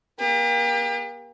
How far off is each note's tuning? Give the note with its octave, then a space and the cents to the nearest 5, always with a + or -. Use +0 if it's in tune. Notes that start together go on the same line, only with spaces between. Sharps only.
A#3 +35 G4 +40